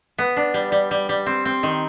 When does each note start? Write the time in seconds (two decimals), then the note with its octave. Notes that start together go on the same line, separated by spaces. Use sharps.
0.18 B3
0.37 D4
0.54 G3
0.72 G3
0.91 G3
1.09 G3
1.26 C4
1.45 C4
1.63 D#3